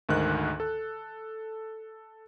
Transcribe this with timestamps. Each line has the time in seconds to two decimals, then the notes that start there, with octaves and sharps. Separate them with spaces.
0.09 D2 G#2 D#3 F#6
0.60 A4